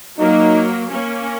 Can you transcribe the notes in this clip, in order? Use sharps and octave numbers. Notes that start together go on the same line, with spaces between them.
F#3 A#3 D#4
A#3 C#4